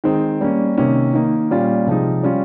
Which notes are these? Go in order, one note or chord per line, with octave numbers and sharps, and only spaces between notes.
D#3 G#3 C4 D#4
G3 A#3 C#4
C3 D#3 A#3 C#4
D#3 A#3 D#4
A#2 G3 C#4 F4
C3 F3 G#3 D#4
G3 C#4 F4